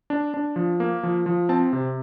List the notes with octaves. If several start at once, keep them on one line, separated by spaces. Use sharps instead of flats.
D4
D4
F3
A#3
F3
F3
C4 A5
C3